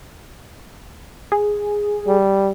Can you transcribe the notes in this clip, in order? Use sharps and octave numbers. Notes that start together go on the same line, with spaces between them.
G#4
G3